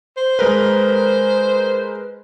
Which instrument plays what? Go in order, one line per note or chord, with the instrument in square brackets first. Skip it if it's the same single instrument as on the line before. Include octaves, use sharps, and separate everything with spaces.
[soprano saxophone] C5
[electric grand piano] G#3 A#4 B4